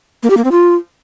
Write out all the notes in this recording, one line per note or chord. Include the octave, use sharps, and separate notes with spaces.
A#3
G4
A#3
C4
F4